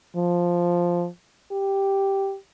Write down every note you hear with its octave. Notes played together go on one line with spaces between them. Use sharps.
F3
G4